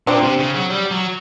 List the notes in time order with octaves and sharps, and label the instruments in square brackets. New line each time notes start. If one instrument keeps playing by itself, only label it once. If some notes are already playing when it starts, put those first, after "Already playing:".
[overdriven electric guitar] A#2 [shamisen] C4 D4
[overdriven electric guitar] C3
C#3
F#3
G3
F#3